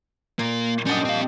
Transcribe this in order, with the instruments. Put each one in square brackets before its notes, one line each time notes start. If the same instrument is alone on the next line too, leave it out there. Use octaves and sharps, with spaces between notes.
[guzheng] A#2 [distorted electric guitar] A#3
[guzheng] G3 D4 D#5 [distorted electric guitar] C#4 F#5
[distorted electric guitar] C4 F5